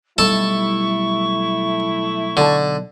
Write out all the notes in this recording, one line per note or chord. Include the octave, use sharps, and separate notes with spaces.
B1 G3 A3 E4 A4 A5 C#6
B1 D3 A5